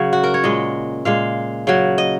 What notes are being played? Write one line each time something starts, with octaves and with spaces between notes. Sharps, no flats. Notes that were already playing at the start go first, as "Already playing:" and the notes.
Already playing: C#3 F#3
F#4
A#4
C#5
A#2 G#3 D#5
A#2 G#3 F5
C#3 F#3
D#5